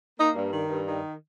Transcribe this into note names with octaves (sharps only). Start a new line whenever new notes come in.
A#3 D#4
G2
D#3
G2
D#3